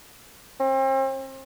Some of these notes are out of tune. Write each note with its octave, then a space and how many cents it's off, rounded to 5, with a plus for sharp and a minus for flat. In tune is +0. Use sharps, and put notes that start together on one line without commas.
C4 +40